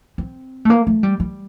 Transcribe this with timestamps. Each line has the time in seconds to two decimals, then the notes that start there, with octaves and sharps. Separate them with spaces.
0.18 C4
0.65 A3
0.70 A#3
0.87 A3
1.03 G3
1.20 G3